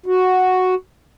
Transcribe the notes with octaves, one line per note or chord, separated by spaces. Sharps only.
F#4